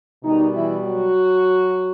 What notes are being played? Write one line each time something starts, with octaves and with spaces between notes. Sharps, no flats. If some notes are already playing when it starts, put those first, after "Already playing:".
B2 D#3 G3 D#4
E3 E4
F#3 F#4